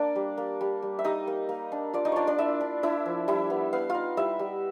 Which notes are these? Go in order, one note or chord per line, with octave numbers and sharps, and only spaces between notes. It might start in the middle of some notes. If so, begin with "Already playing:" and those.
Already playing: A#3 D4 D5
G3
A#3
G3
G3
E5
G3 D#4 D#5
A#3
A#3
D4
F4 D5
D#4 D#5
D4 F4 C#5 D5
D4 D5
E4 F4 E5
D4
D4 E4 E5
F3
G3 E4 E5
B3
B3 F5
D#4 F4 F5
G3 E4 E5
G3